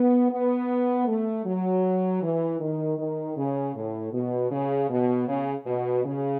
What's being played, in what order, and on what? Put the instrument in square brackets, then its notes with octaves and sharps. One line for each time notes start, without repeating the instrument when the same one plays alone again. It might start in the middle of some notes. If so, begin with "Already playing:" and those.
Already playing: [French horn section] B3
B3
A3
F#3
E3
D#3
D#3
C#3
A2
B2
C#3
B2
C#3
B2
C#3